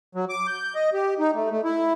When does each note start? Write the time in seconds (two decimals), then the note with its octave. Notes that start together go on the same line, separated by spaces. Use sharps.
0.15 F#3
0.29 D6
0.47 G6
0.75 D#5
0.93 G4
1.19 D#4
1.34 A3
1.51 A3
1.64 E4